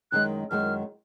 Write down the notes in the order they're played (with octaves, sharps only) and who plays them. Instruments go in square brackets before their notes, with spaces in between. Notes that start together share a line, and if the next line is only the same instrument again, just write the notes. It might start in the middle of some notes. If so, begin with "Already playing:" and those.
[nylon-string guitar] F#2 D#3 G#3 [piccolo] F#6
[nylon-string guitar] F#2 D#3 G#3 [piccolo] F6